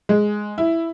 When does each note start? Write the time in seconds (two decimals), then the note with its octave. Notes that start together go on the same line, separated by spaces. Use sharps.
0.09 G#3
0.58 E4